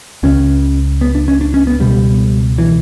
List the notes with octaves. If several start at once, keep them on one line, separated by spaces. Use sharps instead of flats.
C#2 C#3 C#4
B3
D4
C#4
D4
C#4
B3
C#2 B2 G3
E3